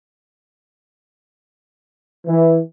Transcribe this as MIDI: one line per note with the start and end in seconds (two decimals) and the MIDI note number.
2.26 2.58 52